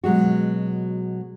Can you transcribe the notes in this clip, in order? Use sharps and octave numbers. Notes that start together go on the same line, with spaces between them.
B2 F#3 G#3 F#4